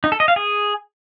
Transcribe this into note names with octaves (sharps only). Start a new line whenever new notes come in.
D#4
A4
D#5
F5
G#4